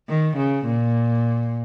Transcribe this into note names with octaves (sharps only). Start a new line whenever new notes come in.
D#3
C#3
A#2